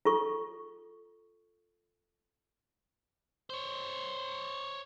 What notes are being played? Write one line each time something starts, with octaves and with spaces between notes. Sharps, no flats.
F4 A4 C#6
C5 C#5